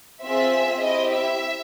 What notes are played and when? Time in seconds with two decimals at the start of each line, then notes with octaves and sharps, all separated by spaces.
0.23 C4 F4 G#4 E5
0.81 C4 E4 G4 D#5
1.10 E5